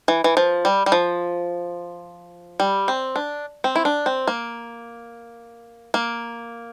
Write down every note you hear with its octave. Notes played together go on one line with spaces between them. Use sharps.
E3
E3
F3
G3
G3
F3
G3
C4
D4
C4
E4
D4
C4
A#3
A#3